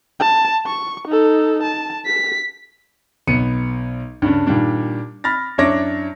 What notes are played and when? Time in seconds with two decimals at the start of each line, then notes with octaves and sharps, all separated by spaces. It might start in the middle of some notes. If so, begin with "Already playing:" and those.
0.20 A5
0.67 C#6
1.08 D#4 A4
1.63 A5
2.06 B6
3.27 B1 B3 C#7 D#7
4.22 G2 C#3 D4
4.47 A#2 D#3 G3 D4
5.24 B5 F6 A6 A#6
5.58 F#2 D4 E4 C#5 D6 A#6